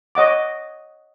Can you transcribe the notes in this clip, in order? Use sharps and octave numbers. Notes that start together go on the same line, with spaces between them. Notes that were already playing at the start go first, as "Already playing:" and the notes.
C#5 D#5 F#5 D6